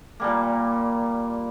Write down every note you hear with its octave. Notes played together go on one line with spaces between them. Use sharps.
A#2 G3 A#3